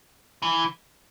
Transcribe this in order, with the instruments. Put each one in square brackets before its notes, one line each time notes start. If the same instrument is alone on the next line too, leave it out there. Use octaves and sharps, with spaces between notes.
[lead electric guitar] E3